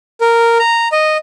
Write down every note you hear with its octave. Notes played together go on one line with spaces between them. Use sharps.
A#4
A#5
D#5